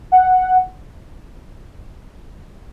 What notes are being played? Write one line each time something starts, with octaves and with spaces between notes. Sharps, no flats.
F#5